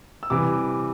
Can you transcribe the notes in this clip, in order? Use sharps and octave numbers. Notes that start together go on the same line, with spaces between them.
E6
C3 E3 G3 D6